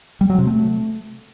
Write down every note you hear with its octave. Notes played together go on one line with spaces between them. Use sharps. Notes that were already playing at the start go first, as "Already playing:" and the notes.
G3
F#3
C3
A3